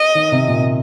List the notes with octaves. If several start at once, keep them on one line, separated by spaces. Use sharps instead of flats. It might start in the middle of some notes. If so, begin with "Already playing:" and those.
Already playing: D#5
D#3
C3
A#2